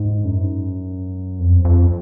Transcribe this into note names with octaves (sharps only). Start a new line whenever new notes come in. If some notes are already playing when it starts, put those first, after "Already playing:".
Already playing: G#2
F#2
F2
F2